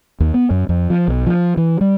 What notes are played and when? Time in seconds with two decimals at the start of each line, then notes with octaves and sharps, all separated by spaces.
0.20 D#2
0.34 B3
0.51 F#2
0.69 F2
0.90 F3
1.08 B1
1.27 F3
1.57 E3
1.81 G3